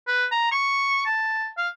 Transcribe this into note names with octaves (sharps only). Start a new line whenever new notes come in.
B4
A#5
C#6
A5
F5